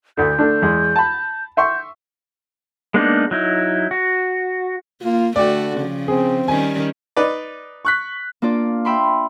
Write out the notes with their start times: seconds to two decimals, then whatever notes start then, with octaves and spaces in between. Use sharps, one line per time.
0.17 D2 D3 G6
0.39 D3 A3 D4
0.62 E2 G#3
0.96 A5 B5
1.57 E5 C6 C#6 G6
2.94 G#3 A#3 B3 D4 D#4
3.31 F#3 D#4 E4
3.91 F#4
5.02 A#3 F4
5.36 D3 A3 F#4 D5 G5
5.77 C#3 F3
6.08 C4 G#4
6.48 D#3 G3 C#4 G#5
7.17 D#4 B4 D5
7.85 C#6 F#6 B6
8.42 A#3 D4 F4 D5
8.85 E5 G5 B5 C6